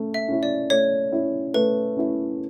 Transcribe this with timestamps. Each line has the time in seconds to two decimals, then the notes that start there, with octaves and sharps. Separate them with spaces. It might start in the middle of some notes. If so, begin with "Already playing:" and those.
Already playing: A3 C#4
0.14 E5
0.28 C#4 E4
0.43 D5
0.70 A3 C#5
1.12 C#4 E4
1.54 A3 B4
1.97 C#4 E4